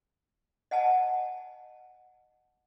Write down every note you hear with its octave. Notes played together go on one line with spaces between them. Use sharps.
D#5 F#5 G#5 A5